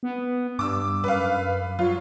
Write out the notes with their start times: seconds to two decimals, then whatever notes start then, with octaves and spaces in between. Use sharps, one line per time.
0.03 B3
0.59 G2 D6 E6
1.04 F#2 B4 F5
1.79 F#3 F4